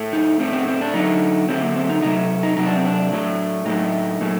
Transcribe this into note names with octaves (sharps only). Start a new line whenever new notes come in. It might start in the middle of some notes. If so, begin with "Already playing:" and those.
Already playing: A2 A3
D#4
A2 A3 C4
C4
C4
D4
D3 F#3 A3 D#4
D3 F#3 A3 C4
A#3
C4
D#4
C3 F#3 A3 D#4
D#4
C3 F#3 A3 D#4
D4
C4
D4
A2 F#3 A3
A2 F#3 A3 D#4
A#2 F#3 A3